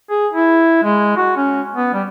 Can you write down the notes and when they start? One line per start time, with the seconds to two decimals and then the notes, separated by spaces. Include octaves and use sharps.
0.10 G#4
0.33 E4
0.83 G#3
1.17 F#4
1.37 C#4
1.75 B3
1.94 G3